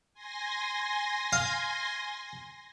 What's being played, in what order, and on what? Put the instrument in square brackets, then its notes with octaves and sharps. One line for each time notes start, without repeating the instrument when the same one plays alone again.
[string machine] G#5 C6 A#6
[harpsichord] F5